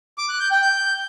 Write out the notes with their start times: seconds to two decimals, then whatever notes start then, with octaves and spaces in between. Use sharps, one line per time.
0.18 D6
0.29 F#6
0.40 G6
0.51 G5
0.62 G6